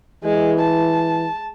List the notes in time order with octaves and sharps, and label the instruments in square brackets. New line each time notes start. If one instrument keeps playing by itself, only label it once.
[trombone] E3 [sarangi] G#3
[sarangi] A5